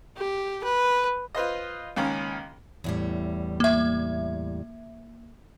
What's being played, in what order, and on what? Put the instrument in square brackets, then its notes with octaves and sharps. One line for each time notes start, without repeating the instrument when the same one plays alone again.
[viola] G4
B4
[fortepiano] F4 B4 C5 D#5
C#2 D#3 A#3 C#4
[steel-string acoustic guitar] E2 A2 G3
[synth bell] A#3 E5